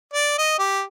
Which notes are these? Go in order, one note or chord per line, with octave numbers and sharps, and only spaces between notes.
D5
D#5
G4